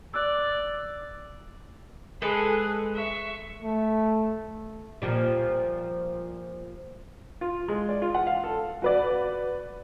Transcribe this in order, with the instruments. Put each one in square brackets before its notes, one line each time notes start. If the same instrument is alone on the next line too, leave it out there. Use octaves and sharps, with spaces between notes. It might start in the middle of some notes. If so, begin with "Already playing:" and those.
[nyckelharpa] D5 [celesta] E6 F#6
[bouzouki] G#3 A4 B4 [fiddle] G#4
[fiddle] E5 C#6
[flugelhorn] A3
[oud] A#2 F3 G3
[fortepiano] F4
G#3
D5
F4
F#5
F5
A4
[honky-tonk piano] F#4 B4 D5